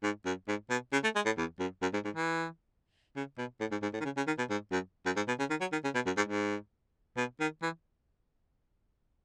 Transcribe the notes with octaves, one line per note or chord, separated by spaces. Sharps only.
G#2
F#2
G#2
B2
C#3
A3
G#3
A2
E2
F#2
F#2
G#2
G#2
E3
C#3
B2
A2
G#2
G#2
A2
D#3
C#3
C#3
D#3
B2
G#2
F#2
F#2
G#2
B2
C#3
D#3
F#3
D#3
C#3
B2
F#2
G#2
G#2
B2
D#3
E3